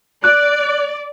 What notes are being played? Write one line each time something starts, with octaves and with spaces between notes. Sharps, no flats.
D5 F#6